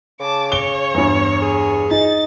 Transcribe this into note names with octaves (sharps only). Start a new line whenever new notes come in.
C#3 A5 D6
C#5 G7
E2 G2
G#4
D#4 A6